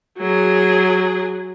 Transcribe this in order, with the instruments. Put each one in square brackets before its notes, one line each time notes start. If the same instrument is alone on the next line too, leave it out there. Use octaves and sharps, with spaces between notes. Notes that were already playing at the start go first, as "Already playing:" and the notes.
[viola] F#3 G#4